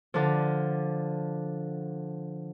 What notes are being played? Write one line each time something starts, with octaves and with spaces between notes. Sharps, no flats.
D3 F3